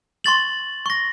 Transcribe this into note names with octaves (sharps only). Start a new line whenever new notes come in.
C6 C#6 A6 F#7
C#6 A#6